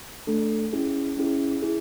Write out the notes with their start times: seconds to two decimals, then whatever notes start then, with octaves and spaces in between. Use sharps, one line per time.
0.27 A3 D4 A4
0.73 C#4 E4 G#4
1.17 C#4 E4 G#4
1.62 E4 G#4